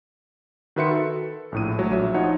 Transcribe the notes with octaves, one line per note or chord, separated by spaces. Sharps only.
D#3 F#4 B4 E5 C6 C#7
A4
A#1 A2 D#7
F#3 A3 C#5
A#1 E5
F3 D#4 C#5 F#5